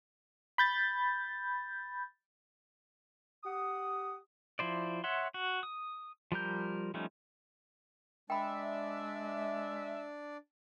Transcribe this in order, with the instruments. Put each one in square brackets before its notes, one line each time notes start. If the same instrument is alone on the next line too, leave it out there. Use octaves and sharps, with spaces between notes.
[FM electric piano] B5 G6 A6
[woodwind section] G4 F#5 D#6
[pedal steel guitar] F3 E4 C5 D5
C#5 E5 F#5 C6
F#4
D#6
F3 G3 A#4 G6
F3 G3 A3 C#4 D#4
[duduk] G#3 [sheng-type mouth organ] D4 D5 [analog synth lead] E5 [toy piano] G5 B5